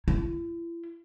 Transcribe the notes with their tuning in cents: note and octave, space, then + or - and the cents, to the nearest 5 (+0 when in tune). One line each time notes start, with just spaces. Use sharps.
E4 +40